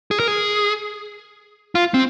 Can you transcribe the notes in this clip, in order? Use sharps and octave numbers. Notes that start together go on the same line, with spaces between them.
G#4
A#4
G#4
F4
C4